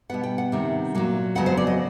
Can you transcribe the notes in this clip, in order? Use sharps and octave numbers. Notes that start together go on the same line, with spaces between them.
B2 G3 B3 F#5
G5
F#5
C3 D#3 G3
A#2 F#3 A#3
F2 C#3 F#3 B3 F#5
C5
D5
D#5